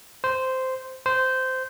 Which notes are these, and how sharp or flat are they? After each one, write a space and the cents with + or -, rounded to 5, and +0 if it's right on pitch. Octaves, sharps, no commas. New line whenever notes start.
C5 -10
C5 -15